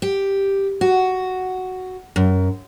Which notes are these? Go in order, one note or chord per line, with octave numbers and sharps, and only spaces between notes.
G4
F#4
F#2